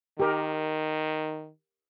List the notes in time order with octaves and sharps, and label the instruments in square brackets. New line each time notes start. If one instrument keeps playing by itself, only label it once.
[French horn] D#3 [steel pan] G4 A#4